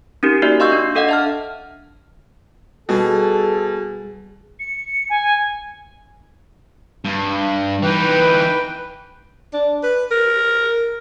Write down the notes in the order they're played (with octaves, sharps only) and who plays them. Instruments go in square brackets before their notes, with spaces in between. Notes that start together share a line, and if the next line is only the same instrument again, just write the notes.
[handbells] C#4 D#4 G4 A#4
A#3 D#4 F#4 D5 E5
D#5 F5 C6 C#6 E6 G6
D4
D4 A4 D#5 F5 F#5
E5 A5 F6
[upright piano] B2 [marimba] G3 [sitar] G#4 [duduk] A4
[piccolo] C#7
G#5
[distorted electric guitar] G2
[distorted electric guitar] E3 D#4 [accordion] B4 G5
[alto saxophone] D4
B4
A#4